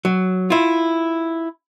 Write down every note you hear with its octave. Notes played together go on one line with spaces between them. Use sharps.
F#3
E4 F4